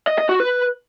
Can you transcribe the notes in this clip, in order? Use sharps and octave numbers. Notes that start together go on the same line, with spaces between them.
D#5
D#5
F#4
B4